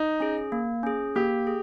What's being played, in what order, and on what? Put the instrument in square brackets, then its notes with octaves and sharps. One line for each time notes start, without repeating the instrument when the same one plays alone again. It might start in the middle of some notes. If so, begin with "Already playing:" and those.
Already playing: [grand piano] D#4
[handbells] C#4 G#4
A#3
C#4 G#4
[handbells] A#3 [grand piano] G4
[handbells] G#4